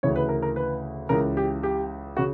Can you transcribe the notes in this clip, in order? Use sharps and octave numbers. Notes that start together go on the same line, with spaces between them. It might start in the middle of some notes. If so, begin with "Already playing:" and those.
D2 C#3 E3 C#5
B4
A#4
A#4
B4
C#2 C#3 E3 A#4
G4
G4
C#3 F#4